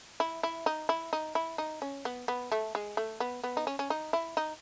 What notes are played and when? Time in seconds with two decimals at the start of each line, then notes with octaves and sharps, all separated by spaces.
0.20 E4
0.43 E4
0.66 D#4
0.89 E4
1.13 D#4
1.35 E4
1.58 D#4
1.82 C#4
2.05 B3
2.28 B3
2.52 A3
2.75 G#3
2.97 A3
3.20 B3
3.43 B3
3.57 D#4
3.67 C#4
3.79 C#4
3.90 D#4
4.13 E4
4.37 D#4